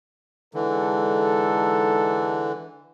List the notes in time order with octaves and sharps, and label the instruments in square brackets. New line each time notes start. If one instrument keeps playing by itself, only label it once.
[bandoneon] D3 E3 [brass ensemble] G#3 D#4 A4